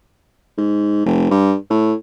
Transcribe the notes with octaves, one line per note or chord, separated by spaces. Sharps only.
G#2
F1
G2
A2